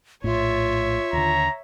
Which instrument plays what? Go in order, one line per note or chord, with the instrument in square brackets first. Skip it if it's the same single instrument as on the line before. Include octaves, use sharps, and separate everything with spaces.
[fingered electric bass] A#1 A2 [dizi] F4 [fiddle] C#5 E5
[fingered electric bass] D#2 D3 [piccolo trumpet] A#5